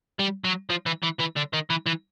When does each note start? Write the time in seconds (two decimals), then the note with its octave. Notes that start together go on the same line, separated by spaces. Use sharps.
0.19 G3
0.44 F#3
0.70 F3
0.86 E3
1.03 E3
1.20 E3
1.37 D3
1.53 D#3
1.70 E3
1.86 E3